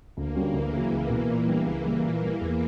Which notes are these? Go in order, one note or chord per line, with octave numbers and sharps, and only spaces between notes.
D2 A#3
D3 G3 C#4 F#4
D2 E3
C#3 F#3
C#2
B2 A#3
A#2
G3 B3 D4
C#2
C#3 G3 A#3
A#2
G3 A#3
E2